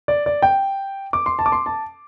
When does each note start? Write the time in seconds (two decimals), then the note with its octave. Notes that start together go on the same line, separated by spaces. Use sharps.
0.08 D5
0.26 D5
0.42 G5
1.13 D6
1.26 C6
1.39 A5
1.46 D6
1.52 C6
1.66 A5